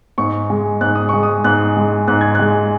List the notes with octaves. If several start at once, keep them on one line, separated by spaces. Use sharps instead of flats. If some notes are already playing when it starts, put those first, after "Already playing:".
G#2 C#6
G#3
G#2 F#6
D#6
G#3 C#6
D#6
G#2 F#6
G#3
G#2 F#6
G#6
G#3 F#6